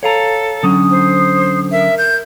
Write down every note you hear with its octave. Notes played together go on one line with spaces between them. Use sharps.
A4 C#5 F5 A#5
D3 F#3 C#4 D#6
C5
A#4 E5
G6